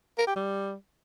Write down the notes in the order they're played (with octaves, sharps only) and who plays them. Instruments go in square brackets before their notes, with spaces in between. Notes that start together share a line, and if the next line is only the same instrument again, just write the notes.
[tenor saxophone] A#4
G4
G3